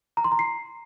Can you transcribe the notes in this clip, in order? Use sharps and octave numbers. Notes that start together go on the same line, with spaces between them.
A#5
C6
A#5
C7